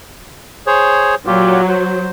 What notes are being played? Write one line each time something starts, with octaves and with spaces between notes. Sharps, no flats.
G#4 C5 C#5
A#2 F#3 F4 G4
C5